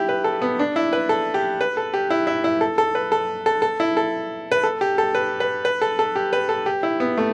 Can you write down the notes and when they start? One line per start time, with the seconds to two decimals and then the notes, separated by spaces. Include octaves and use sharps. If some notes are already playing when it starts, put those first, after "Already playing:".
Already playing: E4 G4
0.09 B4
0.24 A4
0.42 B3
0.59 D4
0.76 E4
0.93 B4
1.09 A4
1.34 G4
1.61 B4
1.77 A4
1.94 G4
2.10 E4
2.27 E4
2.44 E4
2.61 A4
2.78 A4
2.95 B4
3.12 A4
3.46 A4
3.62 A4
3.80 E4
3.97 A4
4.52 B4
4.64 A4
4.81 G4
4.98 A4
5.15 B4
5.40 B4
5.65 B4
5.82 A4
5.99 A4
6.16 G4
6.33 B4
6.49 A4
6.66 G4
6.83 E4
7.00 B3
7.18 A3